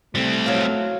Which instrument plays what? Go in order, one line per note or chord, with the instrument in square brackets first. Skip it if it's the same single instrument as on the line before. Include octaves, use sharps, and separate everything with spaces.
[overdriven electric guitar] G3 C4 [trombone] A3
[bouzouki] F#3 F4